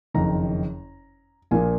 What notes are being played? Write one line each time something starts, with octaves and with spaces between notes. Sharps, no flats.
F#1 F2 D#3 A#5
A#1 A#2 F3 A#3 G#5